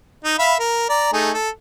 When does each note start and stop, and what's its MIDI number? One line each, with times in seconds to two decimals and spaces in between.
0.24 0.35 63
0.38 0.55 76
0.38 0.55 77
0.38 0.55 83
0.59 0.88 70
0.89 1.11 74
0.89 1.11 82
1.13 1.31 57
1.13 1.31 63
1.13 1.31 68
1.34 1.49 69